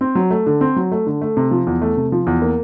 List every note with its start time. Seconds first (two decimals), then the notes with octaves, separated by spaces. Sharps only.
0.01 C4
0.15 F#3
0.31 A3
0.46 D3
0.61 C4
0.76 F#3
0.92 A3
1.06 D3
1.21 A3
1.37 C3
1.51 F3
1.67 E2
1.81 A3
1.97 C3
2.12 F3
2.27 E2
2.42 A#3